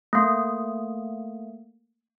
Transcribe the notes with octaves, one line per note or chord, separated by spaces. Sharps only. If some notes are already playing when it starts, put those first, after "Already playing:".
A3 A#3